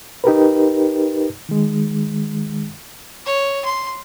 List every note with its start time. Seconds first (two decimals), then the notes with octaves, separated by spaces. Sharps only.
0.24 D#4 G4 A#4 B4
1.49 D#3 G#3
3.26 C#5
3.65 C6